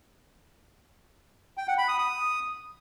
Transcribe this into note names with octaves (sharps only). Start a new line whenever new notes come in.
G5
F#5
B5
D#6
D#6